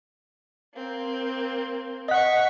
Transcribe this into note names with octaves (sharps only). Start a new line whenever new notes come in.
A#3 C4
D#5 F#5 C#6 B6